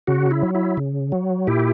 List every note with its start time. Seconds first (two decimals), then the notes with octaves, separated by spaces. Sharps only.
0.07 C#3 F#4
0.31 E4
0.42 F#3
0.55 E4
0.77 C#3
1.12 F#3
1.47 A#2 E4 G4